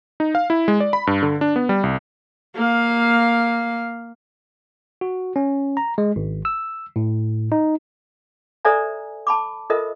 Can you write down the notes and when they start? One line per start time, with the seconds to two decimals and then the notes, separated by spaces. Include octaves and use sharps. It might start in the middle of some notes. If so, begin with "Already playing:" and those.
0.20 D#4
0.35 F5
0.50 E4
0.68 G#3
0.80 D5
0.93 B5
1.07 G2
1.22 D3
1.41 D4
1.56 B3
1.69 G3
1.84 C2
2.55 A#3 F5
5.01 F#4
5.36 C#4
5.77 A#5
5.98 G#3
6.16 G#1
6.45 E6
6.96 A2
7.52 D#4
8.65 A4 C5 D5 E5 G#5 A#5
9.27 A5 B5 D6
9.70 F4 A4 A#4 C5 D#5 E5